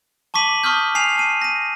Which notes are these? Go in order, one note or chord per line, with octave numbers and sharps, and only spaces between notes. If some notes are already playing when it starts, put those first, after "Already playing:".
A5 C#6 D6 B6 D#7 F#7
A5 C#6 D#6 F6 G6
G#5 C7 D#7 F7
A5 D#7
A#6 D#7